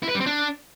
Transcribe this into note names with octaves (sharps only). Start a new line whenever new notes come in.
E4
B4
G3
C4
D4